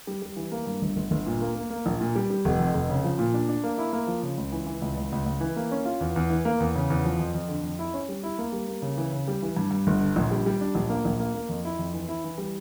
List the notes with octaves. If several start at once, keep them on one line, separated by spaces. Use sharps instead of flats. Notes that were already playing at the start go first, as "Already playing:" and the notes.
G3
G3
E3
A#3
G2
G1
G1
G1
A#2
A#3
A#3
A#3
A#1
A#2
G3
G3
F1
F2
F1
C#3
F3
A#2
D4
D4
A#3
E4
A#3
F3
C#3
C#2
E3
E3
C#2
C#2
C#2
C#2
E3
A#3
C#4
F4
E2
E2
E3
A#3
E2
C#3
E2
F3
F2
F2
D3
F2
E4
C#4
G3
E4
A#3
G3
A#3
C#3
E3
C#3
G3
E3
G2
G2
G1
D3
A#1
G3
G3
D4
A#1
A#3
A#1
A#3
A#3
F2
E4
F2
E3
E4
E3
G3